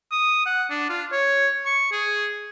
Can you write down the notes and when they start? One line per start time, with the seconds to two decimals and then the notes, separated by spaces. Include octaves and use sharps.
0.11 D#6
0.46 F#5
0.70 D4
0.89 F4
1.12 C#5
1.65 C#6
1.92 G#4